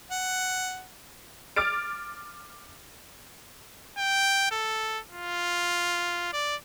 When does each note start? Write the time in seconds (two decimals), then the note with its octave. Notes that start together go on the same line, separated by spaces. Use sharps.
0.11 F#5
1.56 D6 F6 A6 D7
3.98 G5
4.51 A4
5.12 F4
6.33 D5